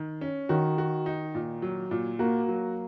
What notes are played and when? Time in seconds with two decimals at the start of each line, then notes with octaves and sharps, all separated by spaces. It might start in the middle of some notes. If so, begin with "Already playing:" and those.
Already playing: D#3
0.21 C#4
0.49 D#3 F#4
0.78 F#4
1.06 D#4
1.35 A#2
1.62 F#3
1.91 A#2
2.19 A#3 F#4
2.48 F#3